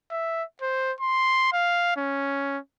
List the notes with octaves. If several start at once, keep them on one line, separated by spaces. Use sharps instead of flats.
E5
C5
C6
F5
C#4